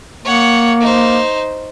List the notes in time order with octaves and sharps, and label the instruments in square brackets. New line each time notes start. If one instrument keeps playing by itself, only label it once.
[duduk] A#3 [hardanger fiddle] C#5 F#5
[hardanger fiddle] D#4 C5